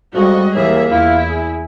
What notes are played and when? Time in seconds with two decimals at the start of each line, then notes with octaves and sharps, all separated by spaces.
0.14 F2 G3 G#3 F#4 D#5
0.55 D#2 E3 A#3 G#4 E5
0.92 E2 E4 F4
1.29 G#4